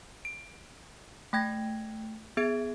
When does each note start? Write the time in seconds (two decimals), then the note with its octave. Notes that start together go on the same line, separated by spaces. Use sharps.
0.25 D7
1.33 A3 G5 G#6 A#6
2.37 B3 G#4 E5 G#6 D7